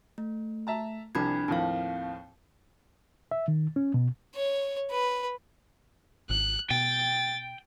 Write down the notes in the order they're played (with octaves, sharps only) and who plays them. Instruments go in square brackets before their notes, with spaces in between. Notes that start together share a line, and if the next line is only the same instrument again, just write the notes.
[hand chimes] A3
[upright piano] E5 A5 A#5
[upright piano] C2 C3 F3 [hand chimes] D4 B5 G#6
[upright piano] D#2 A2 F3 [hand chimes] C4 F5
[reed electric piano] E5
D#3
C#4
B2
[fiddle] C#5
B4
[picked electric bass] G#1 [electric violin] F#6
[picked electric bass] B2 [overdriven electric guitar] G5 [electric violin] A6